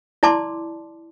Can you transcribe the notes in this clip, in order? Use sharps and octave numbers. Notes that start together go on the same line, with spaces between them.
E4 D5 A5 C6 D6